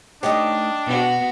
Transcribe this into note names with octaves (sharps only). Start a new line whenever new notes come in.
A3 D4 D#4 G4 C#5 D#5 D#6
B2 B3 F#4